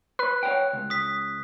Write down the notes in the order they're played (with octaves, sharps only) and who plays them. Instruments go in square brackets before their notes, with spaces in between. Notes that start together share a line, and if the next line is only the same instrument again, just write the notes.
[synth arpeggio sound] B4 [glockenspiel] F#6
[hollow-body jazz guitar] C#5 F#5 G5
C#2
[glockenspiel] D#6 B6